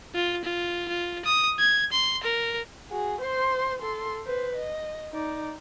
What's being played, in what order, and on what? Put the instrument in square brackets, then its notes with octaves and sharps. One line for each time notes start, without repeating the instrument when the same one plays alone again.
[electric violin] F4
F4
F4
D#6
G#6
C6
A#4
[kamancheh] F#4 G#4
C5 C6
A4 C6
B4 C5
D#5
D#4 D5